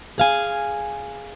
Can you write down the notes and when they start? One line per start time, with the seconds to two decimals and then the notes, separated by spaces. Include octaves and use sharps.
0.18 G#4 F5 G#5